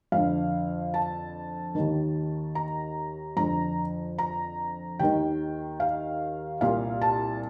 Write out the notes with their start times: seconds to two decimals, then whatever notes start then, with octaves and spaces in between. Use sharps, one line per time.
0.12 F2 D3 F5
0.94 A5
1.75 D#2 D#3
2.55 A#5
3.37 F2 D3 A#5
4.18 A#5
4.99 D#2 D#3 G5
5.80 F5
6.61 C2 A#2 F5
7.01 A5